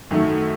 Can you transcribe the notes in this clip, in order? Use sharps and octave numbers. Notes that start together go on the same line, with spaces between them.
F#2 D#3 F#3 A3